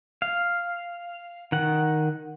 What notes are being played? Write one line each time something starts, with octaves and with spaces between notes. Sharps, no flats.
F5
D#3 F#5